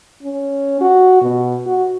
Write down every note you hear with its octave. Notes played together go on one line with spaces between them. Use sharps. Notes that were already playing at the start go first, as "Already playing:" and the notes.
C#4
F#4
B2
F#4